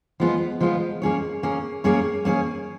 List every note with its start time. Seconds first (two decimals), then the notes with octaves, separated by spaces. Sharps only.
0.20 F3 G#3 B3 F4
0.60 F3 G#3 B3 F4
1.02 A#3 C#4 G#4 C#5
1.43 A#3 C#4 G#4 C#5
1.84 A#3 C#4 G#4 C#5
2.25 A#3 C#4 G#4 C#5